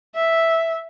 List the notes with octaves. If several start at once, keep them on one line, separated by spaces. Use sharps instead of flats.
E5